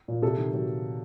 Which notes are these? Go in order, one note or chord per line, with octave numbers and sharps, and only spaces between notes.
A#2
C3 A4
D#3
F#3